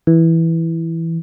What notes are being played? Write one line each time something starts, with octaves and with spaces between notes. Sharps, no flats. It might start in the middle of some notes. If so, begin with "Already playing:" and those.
E3